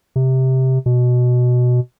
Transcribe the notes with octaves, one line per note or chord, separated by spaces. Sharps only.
C3
B2